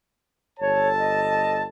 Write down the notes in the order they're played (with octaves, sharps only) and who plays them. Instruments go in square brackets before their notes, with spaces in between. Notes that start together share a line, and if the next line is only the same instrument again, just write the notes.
[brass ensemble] G1 A4 A5 [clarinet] C#5
[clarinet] D#5